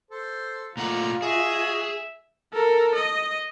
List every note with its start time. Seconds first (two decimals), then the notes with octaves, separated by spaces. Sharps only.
0.11 A4 C5
0.77 A#2 A3 F4 D5 F#5 A#5
1.22 F#4 G#4 D#5 E5
2.53 A4 A#4
2.95 D#5